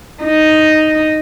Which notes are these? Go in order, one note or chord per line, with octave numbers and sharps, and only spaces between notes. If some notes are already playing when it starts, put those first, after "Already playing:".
D#4